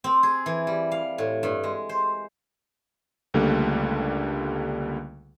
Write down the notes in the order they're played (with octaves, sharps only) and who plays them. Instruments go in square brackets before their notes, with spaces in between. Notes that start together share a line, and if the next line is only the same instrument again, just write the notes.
[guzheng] C4
G#4
E3
G3
F5
A2
G2
G#3
C5
[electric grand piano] C#2 D3 G3 A3 A#3